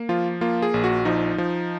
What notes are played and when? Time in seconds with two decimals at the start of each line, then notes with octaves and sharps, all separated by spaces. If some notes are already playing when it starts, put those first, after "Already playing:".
Already playing: A#3
0.09 F3 F4
0.41 A#3 F4
0.62 G#4
0.74 A#1
0.84 F#4
1.05 F3 D#4
1.38 F3